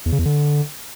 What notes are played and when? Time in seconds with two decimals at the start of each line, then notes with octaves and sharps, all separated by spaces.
0.06 E2
0.12 C#3
0.19 E2
0.25 D3